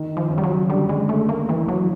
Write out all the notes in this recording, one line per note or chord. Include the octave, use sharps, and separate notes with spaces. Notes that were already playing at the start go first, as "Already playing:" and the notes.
Already playing: D#3 D#4
F3
C#3 C#4
G3
F#3
D3 G3 D4
G#3
A3
A#3
E3
F#3